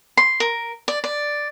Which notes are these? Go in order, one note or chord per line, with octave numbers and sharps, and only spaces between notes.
C6
A#4
D5
D5